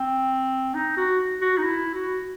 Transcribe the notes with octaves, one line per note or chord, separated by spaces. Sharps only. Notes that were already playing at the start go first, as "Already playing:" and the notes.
Already playing: C4
D#4
F#4
F#4
D#4
E4
F#4